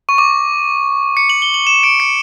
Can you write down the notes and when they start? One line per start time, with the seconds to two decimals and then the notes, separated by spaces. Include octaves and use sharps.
0.09 C#6
0.18 D6
1.17 C#7
1.30 F#7
1.42 G7
1.54 F#7
1.67 E7
1.83 D7
2.00 C#7